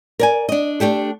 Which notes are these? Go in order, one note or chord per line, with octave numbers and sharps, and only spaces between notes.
A#4 D5 G#5
D4 D#5
A3 D4 G4 A4